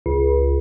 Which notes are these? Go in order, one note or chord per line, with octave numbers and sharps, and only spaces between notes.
C#2